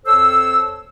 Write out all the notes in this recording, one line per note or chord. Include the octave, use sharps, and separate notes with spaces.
F2 A4 C5 C#5 E6